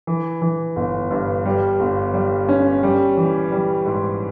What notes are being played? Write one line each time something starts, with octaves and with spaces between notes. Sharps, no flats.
E3
E3
G1
G2
G3
G1
G3
C#4
G3
E3
G3
G#2